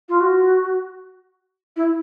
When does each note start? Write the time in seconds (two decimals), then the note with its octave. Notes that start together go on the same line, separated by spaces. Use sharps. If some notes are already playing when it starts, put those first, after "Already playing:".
0.09 F4
0.20 F#4
1.77 E4